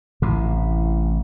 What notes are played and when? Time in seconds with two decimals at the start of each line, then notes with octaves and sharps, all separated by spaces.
0.22 A1 A2 C3